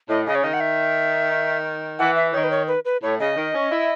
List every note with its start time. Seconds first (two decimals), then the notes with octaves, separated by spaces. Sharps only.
0.09 A2 D#5
0.26 C#3 D#5
0.35 C#5
0.43 D#3 D#5
0.53 F#5
0.60 E5
1.99 E3 F#5
2.16 E5
2.33 D#3 C#5
2.43 B4
2.50 C#5
2.67 B4
2.85 B4
3.03 A2 C#5
3.19 C#3 D#5
3.36 D#3
3.54 C#4
3.71 E4